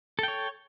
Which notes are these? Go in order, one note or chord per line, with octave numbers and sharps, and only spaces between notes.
A4 C#5 G5